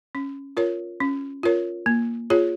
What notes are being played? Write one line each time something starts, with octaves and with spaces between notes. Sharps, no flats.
C#4
F4 A#4 C#5
C#4
F4 A#4 C#5
A#3
F4 G#4 C#5